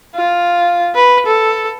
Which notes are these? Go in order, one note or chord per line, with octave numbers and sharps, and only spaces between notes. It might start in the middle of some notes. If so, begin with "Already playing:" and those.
F4
B4
A4